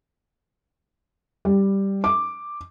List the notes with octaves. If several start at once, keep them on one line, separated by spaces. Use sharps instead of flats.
G3
D6